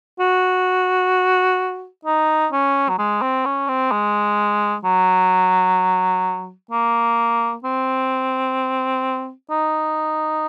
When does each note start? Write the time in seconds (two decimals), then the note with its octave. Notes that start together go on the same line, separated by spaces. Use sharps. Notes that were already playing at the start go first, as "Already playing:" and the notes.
0.20 F#4
2.05 D#4
2.52 C#4
2.89 F#3
2.98 G#3
3.22 C4
3.45 C#4
3.68 C4
3.92 G#3
4.84 F#3
6.71 A#3
7.64 C4
9.50 D#4